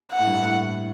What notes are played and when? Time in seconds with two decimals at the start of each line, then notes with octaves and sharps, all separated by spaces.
0.12 F#5
0.19 A2
0.27 G2
0.43 A2